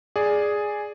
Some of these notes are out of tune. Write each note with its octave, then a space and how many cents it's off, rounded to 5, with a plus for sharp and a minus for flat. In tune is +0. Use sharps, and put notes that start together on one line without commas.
G#4 +0 D5 +0